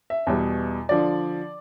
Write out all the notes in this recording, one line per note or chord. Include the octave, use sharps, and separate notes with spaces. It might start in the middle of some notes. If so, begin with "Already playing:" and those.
E5
E2 B2 G3
D3 F3 D5